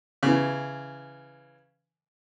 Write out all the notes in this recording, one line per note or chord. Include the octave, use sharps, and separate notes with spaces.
C#3 E3